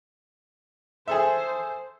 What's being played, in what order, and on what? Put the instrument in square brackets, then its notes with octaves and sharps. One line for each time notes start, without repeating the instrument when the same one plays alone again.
[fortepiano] G#4 A4 E5 [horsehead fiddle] C5